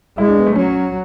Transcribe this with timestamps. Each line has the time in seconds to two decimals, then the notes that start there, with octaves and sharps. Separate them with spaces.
0.18 G#3 E4
0.28 D4
0.37 B3
0.47 A3
0.56 F#3 C#4